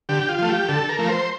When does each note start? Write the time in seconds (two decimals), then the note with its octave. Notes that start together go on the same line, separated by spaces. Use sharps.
0.09 D3 G4
0.29 F4
0.38 F3 A3
0.49 G4
0.68 D3 A4
0.89 A#4
0.99 F3 A3
1.09 C5